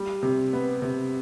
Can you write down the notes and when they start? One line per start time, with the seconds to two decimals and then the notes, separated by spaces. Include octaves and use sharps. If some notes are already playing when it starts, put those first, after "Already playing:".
Already playing: G3
0.23 C3
0.53 B3
0.82 C3